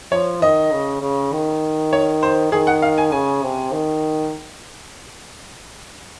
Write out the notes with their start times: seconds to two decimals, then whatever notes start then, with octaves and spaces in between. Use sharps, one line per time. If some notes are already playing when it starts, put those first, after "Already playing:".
0.12 F3 C#5
0.42 D#3 D#5
0.72 C#3
1.02 C#3
1.32 D#3
1.93 C#5
2.23 C5
2.52 D#3 G#4
2.67 F#5
2.82 F5
2.98 G#5
3.12 C#3 G#5
3.43 C3
3.72 D#3